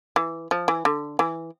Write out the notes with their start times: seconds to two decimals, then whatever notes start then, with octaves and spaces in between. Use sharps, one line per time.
0.16 E3
0.51 F3
0.68 E3
0.85 D3
1.19 E3